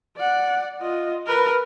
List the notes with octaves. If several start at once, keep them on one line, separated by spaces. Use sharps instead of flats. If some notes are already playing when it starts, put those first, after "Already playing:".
D5 F#5
F4 D#5
A#4 B4